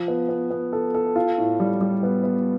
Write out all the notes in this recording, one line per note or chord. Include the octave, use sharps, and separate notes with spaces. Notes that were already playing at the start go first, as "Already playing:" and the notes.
Already playing: F3
B3
B3
B3
A4
A4
F4
A2
G3
G3
B3
B3